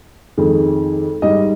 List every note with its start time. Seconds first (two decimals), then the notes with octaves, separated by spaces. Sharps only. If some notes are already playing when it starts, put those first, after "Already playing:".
0.38 F2 D#3 G#3
1.22 G#2 G3 D#5